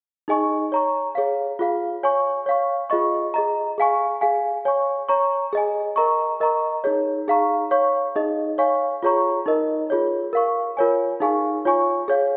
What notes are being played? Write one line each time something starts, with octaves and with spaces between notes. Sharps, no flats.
D#4 G#4 D#5 G#5 C#6
C#5 A#5 C#6
G#4 C#5 F5
F4 G#4 F5
C#5 G#5 C#6
C#5 F5 C#6
F4 G#4 D#5 C#6
G#4 D#5 A#5
G#4 F5 G#5 C#6
G#4 F5 G#5
C#5 G#5 C#6
C#5 A#5 C#6
G#4 D#5 G#5
A#4 D#5 A#5 C#6
A#4 D#5 A#5 C#6
D#4 G#4 C#5
D#4 G#4 F5 A#5 C#6
C#5 F5 C#6
D#4 G#4 D#5
C#5 F5 G#5 C#6
F4 G#4 C#5 A#5 C#6
D#4 A#4 D#5
F4 G#4 C#5
A#4 F5 C#6
F4 A#4 C#5 G#5
D#4 G#4 F5 G#5 C#6
F4 C#5 G#5 C#6
G#4 C#5 F5